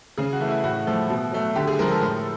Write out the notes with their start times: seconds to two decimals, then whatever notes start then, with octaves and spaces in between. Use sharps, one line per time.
0.18 C#3 G#4
0.33 F#4
0.40 E3 A3
0.49 E4
0.64 A2 F#4
0.87 F3 A3
1.10 B2
1.32 F#3 A3
1.56 D3 G4
1.68 G#4
1.79 F3 G#3 A#4
1.90 A4
2.01 A2